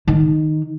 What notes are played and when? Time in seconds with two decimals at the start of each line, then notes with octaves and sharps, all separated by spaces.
0.08 D#3